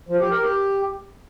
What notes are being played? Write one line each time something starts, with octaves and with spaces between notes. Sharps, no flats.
F3
G4
A#4
G4